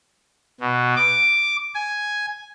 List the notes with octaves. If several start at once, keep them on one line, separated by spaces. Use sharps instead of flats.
B2
D6
G#5